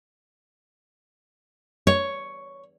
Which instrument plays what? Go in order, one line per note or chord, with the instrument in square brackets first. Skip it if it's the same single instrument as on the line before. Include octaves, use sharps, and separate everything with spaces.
[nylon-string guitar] C#5